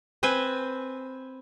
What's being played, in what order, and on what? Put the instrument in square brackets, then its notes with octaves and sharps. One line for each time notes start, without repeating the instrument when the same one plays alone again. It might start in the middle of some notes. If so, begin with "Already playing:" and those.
[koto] C4 B4 C5 G#5